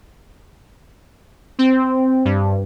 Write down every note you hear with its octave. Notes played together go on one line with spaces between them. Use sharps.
C4
G2